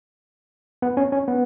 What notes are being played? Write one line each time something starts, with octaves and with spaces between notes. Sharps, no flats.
B3
C#4
C#4
B3